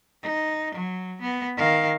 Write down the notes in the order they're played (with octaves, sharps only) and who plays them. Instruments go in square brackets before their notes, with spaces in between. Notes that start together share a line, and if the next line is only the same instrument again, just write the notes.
[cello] D#4
F#3
B3
D#3 F5